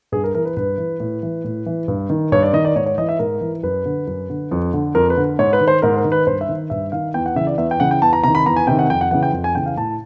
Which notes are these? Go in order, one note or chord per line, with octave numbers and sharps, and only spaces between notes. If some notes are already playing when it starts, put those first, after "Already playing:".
G2 G#4
A#4
E3 A#4
B4
G2 B4
E3
A2
E3
A2
E3
G2
D#3
G2 C#5
D5
D#3 D#5
D5
G#2 C#5
C#5
E3 D#5
E5
G#2 A#4
E3
F#2 B4
D3
F#2
D3
F2
D3
F2 A#4
B4
D3
G#2 C#5
B4
D#3
C5
G#2 A#4
A#4
D#3
B4
G2 C5
E5
D#3
G2 E5
D#3 F5
E2 G5
F#5
C#3 E3 E5
D5
E2 E5
G5
C#3 E3 F#5
G5
E2 A5
A#5
C3 D#3 A#5
B5
E2 A#5
G#5
C3 D#3 G5
F#5
F2 G5
F#5
C#3 E3 F#5
G5
F2
G#5
C#3 E3 G5
F5
A2 A5